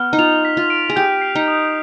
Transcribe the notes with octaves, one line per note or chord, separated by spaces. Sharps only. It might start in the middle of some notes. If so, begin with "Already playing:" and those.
Already playing: B3 F6
D#4
F4 F7
B6
F4
D7
G#4
G4 G6
C7
D#4
D#6